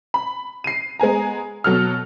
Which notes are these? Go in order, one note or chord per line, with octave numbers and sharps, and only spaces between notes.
B5
C7 D#7
G#3 B3 G#5 A#5
B2 F#3 A4 F6